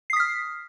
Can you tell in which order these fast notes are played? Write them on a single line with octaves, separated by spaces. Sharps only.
C7 D#6 B6 F6